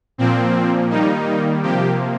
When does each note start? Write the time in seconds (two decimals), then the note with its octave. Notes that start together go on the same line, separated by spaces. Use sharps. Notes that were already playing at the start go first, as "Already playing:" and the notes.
0.18 A#2 F3 A#3 C4
0.90 D#3 G3 A#3 D#4
1.62 C3 F3 A#3 G4